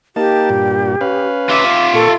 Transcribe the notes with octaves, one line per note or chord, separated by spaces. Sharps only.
A#3 D#4 G4 A5
G2 A#2
C#4 B4 F5
F4 E5 D6
A#2 A4 C#6